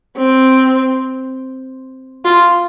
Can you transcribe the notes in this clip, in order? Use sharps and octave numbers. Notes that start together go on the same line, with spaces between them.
C4
F4